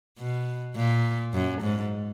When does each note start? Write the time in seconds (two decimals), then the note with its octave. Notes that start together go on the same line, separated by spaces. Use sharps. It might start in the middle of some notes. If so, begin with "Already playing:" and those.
0.19 B2
0.76 A#2
1.34 F#2
1.62 G#2